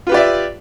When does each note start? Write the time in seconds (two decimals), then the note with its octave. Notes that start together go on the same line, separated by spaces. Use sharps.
0.07 F4
0.09 B4
0.12 G4
0.14 D5
0.17 E5